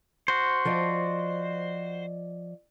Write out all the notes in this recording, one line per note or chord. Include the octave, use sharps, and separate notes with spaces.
F#4 C5
F3 D5 D#5